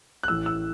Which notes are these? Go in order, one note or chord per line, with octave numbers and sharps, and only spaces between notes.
F#6
A1 A2 E3 E6
E6